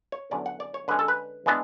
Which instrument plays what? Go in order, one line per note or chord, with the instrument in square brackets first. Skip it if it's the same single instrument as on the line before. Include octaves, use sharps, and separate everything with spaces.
[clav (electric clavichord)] C#5
E2 D3 F#3 C#4 D5
F#5
D5
C#5
D3 G#3 C#4 B4
A4
B4
E3 G#3 B3 D4